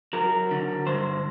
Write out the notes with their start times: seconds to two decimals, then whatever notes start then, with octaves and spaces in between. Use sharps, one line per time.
0.13 F#3 A#4
0.51 D3
0.87 G2 C5